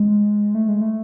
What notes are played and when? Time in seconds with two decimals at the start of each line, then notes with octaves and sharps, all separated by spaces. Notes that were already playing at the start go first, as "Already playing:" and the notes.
Already playing: G#3
0.55 A3
0.68 G#3
0.81 A3